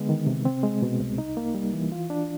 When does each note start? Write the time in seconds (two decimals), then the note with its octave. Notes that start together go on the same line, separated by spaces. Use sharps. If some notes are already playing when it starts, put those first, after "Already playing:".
Already playing: D3 G#3 B3
0.09 D#3
0.27 C3
0.45 C4
0.63 G#3
0.82 B2
1.00 C2
1.18 D#4
1.37 A#3
1.55 G3
1.73 E3
1.92 F4
2.10 D4